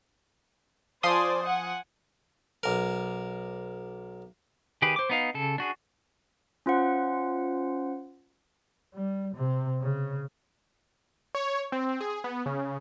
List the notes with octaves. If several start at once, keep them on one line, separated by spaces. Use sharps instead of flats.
F3 C5 D5 G#5 C6 D#6
F#5 G#5
B1 A#4
D#3 G4 G#4 B4
C5 D6
B3 D#4 F5
C#3 A4
D4 F#4 G#4
C#4 F4 C5 F#5
G3
C3
C#3
C#5
C4
G#4
B3
C#3